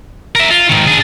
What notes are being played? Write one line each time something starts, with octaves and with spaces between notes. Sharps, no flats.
A#4 E5
F4
G#2 D#3
D4 G#4